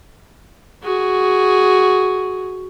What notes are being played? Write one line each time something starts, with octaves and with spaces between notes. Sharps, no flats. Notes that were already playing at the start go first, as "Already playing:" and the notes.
F#4 G#4